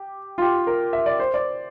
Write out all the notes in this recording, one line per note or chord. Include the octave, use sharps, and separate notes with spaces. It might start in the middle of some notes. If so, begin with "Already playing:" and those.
Already playing: G4
F4
G4
A#4
E5
D5
C5
D5